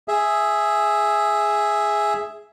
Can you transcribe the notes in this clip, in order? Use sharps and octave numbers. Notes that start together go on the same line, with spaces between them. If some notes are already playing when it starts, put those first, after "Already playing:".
G#4 E5